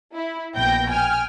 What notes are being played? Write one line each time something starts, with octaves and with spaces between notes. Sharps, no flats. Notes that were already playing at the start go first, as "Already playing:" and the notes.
E4
A#1 B2 G5 G6 A#6
G5 G#5 F6